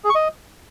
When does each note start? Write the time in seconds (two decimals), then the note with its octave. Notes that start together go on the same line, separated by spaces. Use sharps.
0.04 G#4
0.10 C#6
0.15 D#5